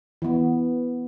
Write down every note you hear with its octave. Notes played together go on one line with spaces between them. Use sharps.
E3 B3